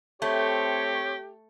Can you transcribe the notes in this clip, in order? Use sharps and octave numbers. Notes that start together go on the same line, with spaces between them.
A3 C4 G4 C#5